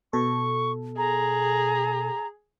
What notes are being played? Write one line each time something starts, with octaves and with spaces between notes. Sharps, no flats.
B2 A4 C#6
G#4 A#5